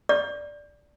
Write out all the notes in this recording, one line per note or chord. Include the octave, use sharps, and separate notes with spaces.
D5